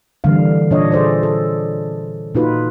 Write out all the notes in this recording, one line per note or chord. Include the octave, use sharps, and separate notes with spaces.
D3 E3 G3 A#3 F5
A#2 D4 C#5 D#5
G#4 A4 C5 D5
A4
A#2 A#3 D#4 F4 F#4 B4